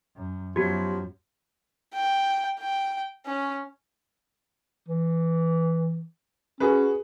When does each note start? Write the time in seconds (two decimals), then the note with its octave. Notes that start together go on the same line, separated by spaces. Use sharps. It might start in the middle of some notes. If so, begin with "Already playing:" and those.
0.16 F#2
0.56 F#2 F3 F#3 B3 F#4 G4
1.94 G5
2.59 G5
3.26 C#4
4.88 E3
6.60 C#4 F#4 G#4 B4